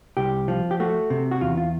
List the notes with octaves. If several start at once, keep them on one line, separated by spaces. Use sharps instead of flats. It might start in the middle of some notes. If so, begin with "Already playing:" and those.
C2 G4
F3
G4
A3 F#4
C3
F#4
E2 F4
F4